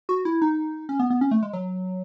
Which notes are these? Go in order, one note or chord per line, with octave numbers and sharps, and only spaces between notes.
F#4
E4
D#4
C#4
B3
B3
C#4
A3
G#3
F#3